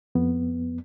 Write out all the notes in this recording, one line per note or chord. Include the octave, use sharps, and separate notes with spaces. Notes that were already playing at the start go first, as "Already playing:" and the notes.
F2 B3